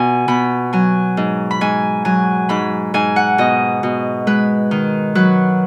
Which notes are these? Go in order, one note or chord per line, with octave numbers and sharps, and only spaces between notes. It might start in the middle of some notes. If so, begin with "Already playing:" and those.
Already playing: B2 G#5
B2 B5
F#3 G#5
G#2
B5
G#2 G#5
F#3 G#5
G#2 B5
G#2 G#5
F#5
B2 D#5
B2
G#3 B4
D#3
F#3 B4